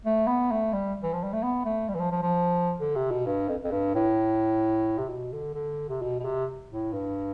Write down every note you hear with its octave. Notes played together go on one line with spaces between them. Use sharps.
A3
B3
A3
G3
E3
F3
G3
A3
B3
A3
G3
E3
F3
F3
F3
D3
C3
B2
G2
F2
F2
G2
A2
C3
B2
D3
D3
C3
B2
B2
C3
A2
G2